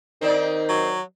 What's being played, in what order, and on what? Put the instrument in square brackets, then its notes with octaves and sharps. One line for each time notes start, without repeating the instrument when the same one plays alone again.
[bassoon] D#3 [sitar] C4 D#4 D5
[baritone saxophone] F#3